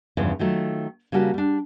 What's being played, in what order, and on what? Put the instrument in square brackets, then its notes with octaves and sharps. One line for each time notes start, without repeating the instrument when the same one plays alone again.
[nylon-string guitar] E2 G2 C#3 F3
D#3 F#3 A3 F4
C#3 G3 A#3 F#4 G5 A5
G3 D4